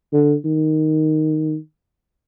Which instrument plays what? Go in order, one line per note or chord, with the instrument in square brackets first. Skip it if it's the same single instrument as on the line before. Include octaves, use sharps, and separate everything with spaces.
[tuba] D3
D#3